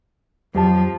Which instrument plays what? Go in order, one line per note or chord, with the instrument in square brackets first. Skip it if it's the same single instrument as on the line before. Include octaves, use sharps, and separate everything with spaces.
[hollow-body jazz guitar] F2 [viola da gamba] F3 [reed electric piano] F#3 G4 A5